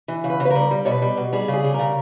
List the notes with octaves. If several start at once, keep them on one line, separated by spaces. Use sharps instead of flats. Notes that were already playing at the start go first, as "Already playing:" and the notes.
E3
C#3
B4
C#3
B4
G3 A#4
G3
B2 C#5
B4
G3
B2
G3 G#4
C#3
G#4
G3
C#3 A#4